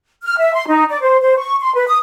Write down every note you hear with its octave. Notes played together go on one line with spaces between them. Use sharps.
F6
E5
C6
D#4
D5
C5
C5
C#6
C6
B4
D#6